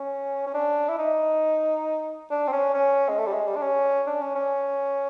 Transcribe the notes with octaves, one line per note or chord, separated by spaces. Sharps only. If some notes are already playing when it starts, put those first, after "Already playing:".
Already playing: C#4
C#4
D4
E4
D#4
D4
C4
C#4
C#4
G#3
A3
G3
G#3
G3
D4
C#4
D4
C#4
C#4